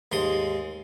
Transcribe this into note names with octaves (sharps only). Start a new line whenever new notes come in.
D#2 G#2 C6 D#6